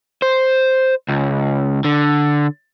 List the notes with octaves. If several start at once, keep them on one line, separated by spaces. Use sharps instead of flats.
C5
C#2
D3